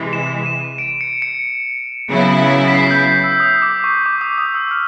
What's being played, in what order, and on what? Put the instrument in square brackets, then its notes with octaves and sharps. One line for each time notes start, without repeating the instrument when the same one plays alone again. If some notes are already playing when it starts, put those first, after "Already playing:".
Already playing: [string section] C3 E3 G#3
[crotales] E7
D#7
D7
C#7
C#7
[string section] C#3 F#3 B3 E4
[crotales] B6
C7
G6
G6
E6
D#6
D6
C#6
D6
D#6
D#6
E6
F6